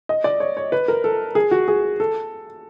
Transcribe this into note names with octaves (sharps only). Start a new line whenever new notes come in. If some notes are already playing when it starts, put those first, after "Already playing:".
D#5
D5
C#5
C#5
B4
A#4
A4
G#4
F#4
G#4
A4